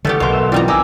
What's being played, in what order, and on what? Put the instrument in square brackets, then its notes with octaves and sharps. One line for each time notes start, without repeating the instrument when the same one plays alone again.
[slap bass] D3 E3 [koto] A3 B3 G4 [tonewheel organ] C#6 F6
[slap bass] B1 [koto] B2 A#3 [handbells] B4 C6
[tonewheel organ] A4 E5 E6
[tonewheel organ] E3 F4 [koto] G3 D#4 A#5 [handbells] C4
[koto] D#4 [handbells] G#5 D6 E6